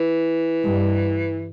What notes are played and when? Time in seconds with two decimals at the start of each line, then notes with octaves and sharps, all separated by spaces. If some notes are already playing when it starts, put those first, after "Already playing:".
Already playing: E3
0.64 G2